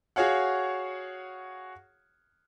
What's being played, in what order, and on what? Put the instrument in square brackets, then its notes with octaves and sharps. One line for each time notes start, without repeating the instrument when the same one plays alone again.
[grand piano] F#4 G#4 C#5 F5 F#5